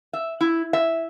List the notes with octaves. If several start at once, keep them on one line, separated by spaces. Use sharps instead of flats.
E5
E4
E5